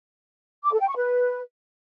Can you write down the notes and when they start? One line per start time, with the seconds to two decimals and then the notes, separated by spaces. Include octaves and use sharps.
0.64 D6
0.72 A4
0.80 G5
0.88 C#6
0.96 B4